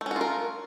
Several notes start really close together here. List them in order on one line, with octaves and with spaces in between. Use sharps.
A3 C#4 F#4 F4 A#4